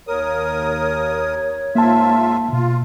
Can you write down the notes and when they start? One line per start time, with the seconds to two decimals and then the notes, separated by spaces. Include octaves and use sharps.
0.08 D#2 A#4 C#5 D#6
1.75 G#2 A#3 F4 E5 A5
2.53 B2 F4